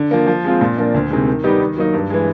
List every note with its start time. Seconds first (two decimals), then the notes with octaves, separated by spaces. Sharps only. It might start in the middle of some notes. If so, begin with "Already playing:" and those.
Already playing: D3
0.11 F3 A#3
0.27 F3
0.44 G#3 C4 F4
0.61 A#2
0.77 F3 A#3 D4
0.94 D2
1.10 C3 D#3 G#3
1.28 D#3
1.44 G3 B3 D#4 G4
1.60 D#3
1.77 F#3 A#3 D#4
1.94 G2
2.10 E3 G#3